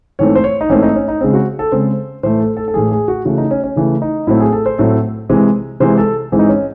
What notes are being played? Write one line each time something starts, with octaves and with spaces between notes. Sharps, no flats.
G#2 E3 A3 C4 C#5
C5
C#5
D#4
G#2 E3 A3 C4 C#4
D#4
C#4
D#4
C#3 G#3 C4
F#4
A4
C#3 G#3 C4 C5
A2 E3 A3 C5
A4
A4
A4
A2 E3 A3 G#4
G#4
F#4
C#3 E3 A3 F#4
D#4
C#4
C#4
C#3 E3 A3
D#4
A2 F#3 A3 C4 E4
G#4
A4
C5
A2 F#3 A3 C4
C3 E3 G#3 C4
C3 E3 G#3 C4 C5
A4
G#2 E3 G#3 C4
D#4
C#4